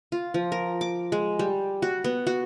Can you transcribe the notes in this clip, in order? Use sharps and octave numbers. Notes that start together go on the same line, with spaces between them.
F4
F3
A#4
D6
G#3
G3
F#4
B3
F#4